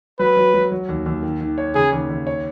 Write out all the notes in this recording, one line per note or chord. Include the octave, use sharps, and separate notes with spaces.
F#3 B4
F#3
F#3
F#3
D#2
D#2
D#3
D#3
C#5
C#3 G#4
D#2
D#2
C#5